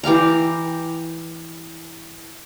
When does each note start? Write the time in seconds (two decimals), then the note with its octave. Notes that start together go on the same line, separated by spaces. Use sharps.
0.03 E3 G4 F5 A#5